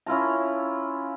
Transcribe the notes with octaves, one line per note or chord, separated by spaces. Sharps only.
C#4 E4 F4 A#5